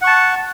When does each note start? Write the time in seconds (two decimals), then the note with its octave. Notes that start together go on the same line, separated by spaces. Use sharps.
0.02 F#5
0.04 C#6
0.07 A5